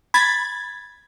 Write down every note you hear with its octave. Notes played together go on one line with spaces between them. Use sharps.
B5 G#6 A6